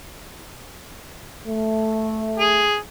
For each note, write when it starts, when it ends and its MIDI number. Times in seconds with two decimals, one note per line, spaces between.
1.45 2.65 57
2.39 2.76 68